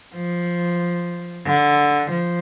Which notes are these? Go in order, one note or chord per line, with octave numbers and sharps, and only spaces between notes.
F3
D3
F3